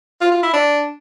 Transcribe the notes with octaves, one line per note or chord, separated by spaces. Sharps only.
F4
F4
E4
D4